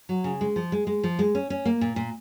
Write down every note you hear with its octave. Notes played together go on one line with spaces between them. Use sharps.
F#3
C#3
G#3
F3
G#3
G#3
F3
G#3
C#4
C#4
A#3
A#2
A#2